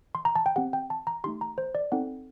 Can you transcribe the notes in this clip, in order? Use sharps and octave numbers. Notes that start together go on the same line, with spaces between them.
C6
A#5
A5
G5
C4 G4 F#5
G5
A5
A#5
A3 D#4 G4 C6
A#5
C5
D5
C4 D#4 A4 F#5